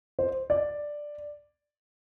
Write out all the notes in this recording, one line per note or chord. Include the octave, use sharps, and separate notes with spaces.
C5
D5